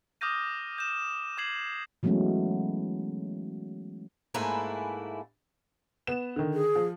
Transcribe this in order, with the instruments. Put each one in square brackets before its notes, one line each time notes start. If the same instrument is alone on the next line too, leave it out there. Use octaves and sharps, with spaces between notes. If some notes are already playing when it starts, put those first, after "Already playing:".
[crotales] D6 D#6 F6 G6 A#6 D#7
G6 E7
D6 G#6 C7 F#7
[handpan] E3 F#3 G#3 A3 B3 C#4
[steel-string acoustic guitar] G#2 A3 A#3 E4 B4 G#5
[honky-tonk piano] B3 E7
D3 D#3
[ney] G#4
[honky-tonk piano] F3